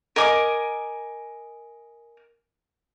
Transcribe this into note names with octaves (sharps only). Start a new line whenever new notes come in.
A#4 D#5 G#5 D6